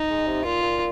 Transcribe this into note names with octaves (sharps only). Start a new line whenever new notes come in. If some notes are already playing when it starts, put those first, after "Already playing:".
Already playing: D#4
G#3
C3
A#2 F4
A#2